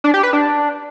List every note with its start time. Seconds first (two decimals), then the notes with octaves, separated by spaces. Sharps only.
0.04 D4
0.14 G4
0.23 B4
0.33 D4